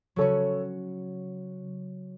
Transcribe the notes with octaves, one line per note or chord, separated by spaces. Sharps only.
C#3 F#3 C#4 F#4 A4 C#5